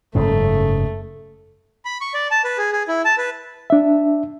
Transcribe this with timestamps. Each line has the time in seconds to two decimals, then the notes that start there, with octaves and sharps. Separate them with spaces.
0.15 F#1 G#2 C#3 A3
1.85 B5
2.01 C#6
2.14 D5
2.31 A5
2.44 B4
2.58 G#4
2.72 G#4
2.88 E4
3.05 A5
3.18 B4
3.70 D4 E5